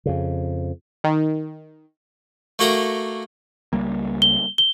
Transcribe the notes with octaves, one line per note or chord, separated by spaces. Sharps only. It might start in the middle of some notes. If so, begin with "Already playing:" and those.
F2 C#3
D#3
A3 A#3 F#4 A4 A#4 A#5
C#2 G3 A#3
G7
G7